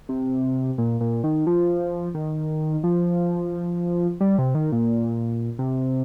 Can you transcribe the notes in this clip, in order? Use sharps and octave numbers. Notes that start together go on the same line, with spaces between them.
C3
A#2
A#2
D#3
F3
D#3
F3
G3
C3
D#3
A#2
C3